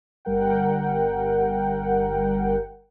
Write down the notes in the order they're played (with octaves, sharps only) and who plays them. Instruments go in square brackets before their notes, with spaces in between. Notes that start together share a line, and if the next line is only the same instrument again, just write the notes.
[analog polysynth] G1 G3 A#4 F#5 G5